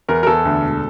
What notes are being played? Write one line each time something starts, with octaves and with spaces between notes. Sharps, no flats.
E2 A#4
A#4
E2 A4
D2
E1